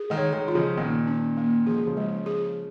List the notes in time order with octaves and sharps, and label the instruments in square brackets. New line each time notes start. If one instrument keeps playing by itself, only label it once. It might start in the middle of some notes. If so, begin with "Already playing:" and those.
Already playing: [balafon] G#4
[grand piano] D#3 G#3
[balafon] C#5
[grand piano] D#3 G#3
[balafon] F4
[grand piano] C#3 F3
[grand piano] A#2 D#3 [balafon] A#3
[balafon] C#4
A#3
[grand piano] F3 [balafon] G#4
[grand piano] G#3
C#3 F3
[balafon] G#3
G#4